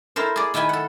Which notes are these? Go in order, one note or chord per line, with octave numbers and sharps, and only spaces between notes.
E4 A4 A#4 C5
G#4 D5
D#3 E4 G5 G#5 B5
A4 F#5